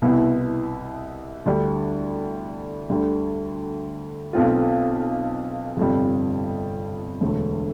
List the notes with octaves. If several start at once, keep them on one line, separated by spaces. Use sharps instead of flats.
C2 B2 B3 E4
D2 D3 G3 D4
D2 D3 G3
B1 B2 A3 C4 F4
G1 F2 C3 G3
E1 D2 D3 A3